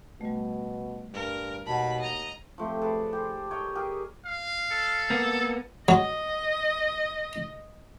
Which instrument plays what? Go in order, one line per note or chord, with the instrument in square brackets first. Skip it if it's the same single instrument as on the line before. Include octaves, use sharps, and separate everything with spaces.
[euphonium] B2 [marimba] G3 A3
[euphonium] G2 [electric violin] A#4
[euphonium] D#2 [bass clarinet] B2 [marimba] F#5 A5 [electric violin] B5
[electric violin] D#5 A#5
[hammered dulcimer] F3 A3 C4 G4
G#4 A4 B4 D5
G4 A4 C5
A#4 C#5 D#5 G5
G4 G#4 A#4
[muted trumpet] F5
[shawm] A4
[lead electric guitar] A#3 B3
[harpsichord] F#3 [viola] D#5